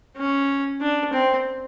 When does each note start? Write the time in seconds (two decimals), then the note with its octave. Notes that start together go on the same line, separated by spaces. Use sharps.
0.17 C#4
0.81 D4
1.13 C4